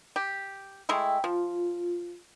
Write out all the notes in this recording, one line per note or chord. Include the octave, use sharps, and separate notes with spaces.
G4
G#3 A3 E4 G5 E6
F3 F4